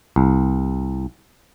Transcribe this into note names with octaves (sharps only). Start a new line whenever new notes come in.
C2